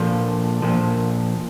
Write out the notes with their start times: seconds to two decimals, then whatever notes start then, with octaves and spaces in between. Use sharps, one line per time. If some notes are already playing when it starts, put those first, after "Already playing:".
Already playing: A#2 F3 A4
0.62 A#2 F3